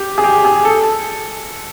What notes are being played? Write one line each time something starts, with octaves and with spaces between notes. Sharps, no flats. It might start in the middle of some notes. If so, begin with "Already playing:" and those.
Already playing: G4
G#4
G4
G#4
A4